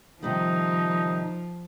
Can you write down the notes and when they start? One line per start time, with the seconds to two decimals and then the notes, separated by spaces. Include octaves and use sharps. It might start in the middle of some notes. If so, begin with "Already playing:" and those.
0.23 C3 D#3 F3 G3 D#4